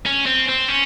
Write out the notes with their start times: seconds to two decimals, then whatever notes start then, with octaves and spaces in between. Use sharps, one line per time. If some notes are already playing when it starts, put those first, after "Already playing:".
0.06 C#4
0.26 C4
0.48 C4
0.68 C#4